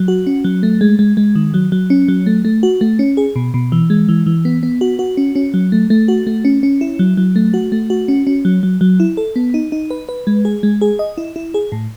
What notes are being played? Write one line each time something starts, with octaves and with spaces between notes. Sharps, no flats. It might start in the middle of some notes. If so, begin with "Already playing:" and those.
Already playing: F#3
F#4
C#4
F#3
A3
G#3
G#3
G#3
D#3
F#3
F#3
C#4
F#3
A3
A3
F#4
A3
C#4
G#4
B2
B2
E3
G#3
E3
E3
B3
B3
F#4
F#4
C#4
C#4
F#3
A3
A3
F#4
A3
C#4
C#4
E4
F#3
F#3
A3
F#4
A3
F#4
C#4
C#4
F#3
F#3
F#3
E4
A4
B3
D#4
D#4
B4
B4
G#3
G#4
G#3
G#4
D#5
E4
E4
G#4
A2